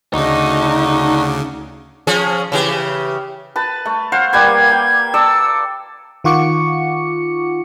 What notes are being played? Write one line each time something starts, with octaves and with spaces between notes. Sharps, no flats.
D2 C#3 A3 D4 D#4 F#4
F3 C#4 G#4
C#3 E3 G4
B4 A5
A3
C5 F5 F#5
G3 A#3 B4 G#6
G5
A4 D5 E6
D#3 F4 F#5 C#6 D6 C#7